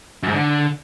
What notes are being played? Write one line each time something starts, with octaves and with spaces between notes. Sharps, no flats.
F#2
G#2
D3